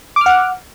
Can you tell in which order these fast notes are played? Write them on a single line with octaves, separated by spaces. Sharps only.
D6 F6 F#5